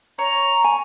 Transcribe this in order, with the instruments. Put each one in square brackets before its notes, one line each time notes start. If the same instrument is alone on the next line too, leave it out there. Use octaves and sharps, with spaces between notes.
[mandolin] C#5 [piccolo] A#5
[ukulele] G#5